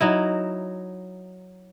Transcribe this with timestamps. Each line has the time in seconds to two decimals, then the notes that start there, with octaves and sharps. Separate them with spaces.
0.01 F#3 D#4 E4